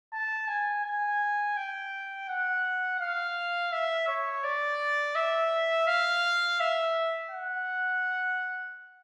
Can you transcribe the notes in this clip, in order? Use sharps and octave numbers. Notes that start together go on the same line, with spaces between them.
A5
G#5
G#5
G5
F#5
F5
E5
C#5
D5
E5
F5
E5
F#5